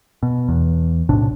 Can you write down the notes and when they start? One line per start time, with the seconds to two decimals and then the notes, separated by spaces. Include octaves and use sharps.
0.23 B2
0.49 E2
1.09 B1 A2 C3 D4